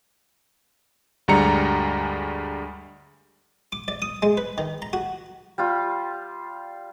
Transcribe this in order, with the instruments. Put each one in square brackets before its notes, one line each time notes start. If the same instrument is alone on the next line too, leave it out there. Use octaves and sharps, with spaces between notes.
[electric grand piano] D2 G2 G3 G#3 A#5 C#7
[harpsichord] D6
D5
D#6
G#3
B4
D#3
A#5
F#4
[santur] G3 F4